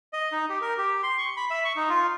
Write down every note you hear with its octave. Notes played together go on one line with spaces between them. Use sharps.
D#5
D#4
G4
A#4
G4
C6
C#6
B5
E5
C#6
D#4
F4